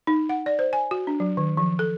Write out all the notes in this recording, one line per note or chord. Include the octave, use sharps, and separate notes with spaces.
D#4
F#5
D5
C5
G#5
F#4
D4
F#3
D#3
F3
A4